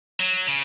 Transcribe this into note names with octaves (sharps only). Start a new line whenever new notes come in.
F#3
C#3